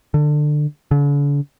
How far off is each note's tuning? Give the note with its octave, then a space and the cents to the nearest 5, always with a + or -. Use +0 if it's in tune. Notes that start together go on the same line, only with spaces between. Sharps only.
D3 +20
D3 -45